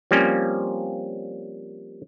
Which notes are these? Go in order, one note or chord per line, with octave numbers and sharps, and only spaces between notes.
F3 G3 A#3 C4 C#4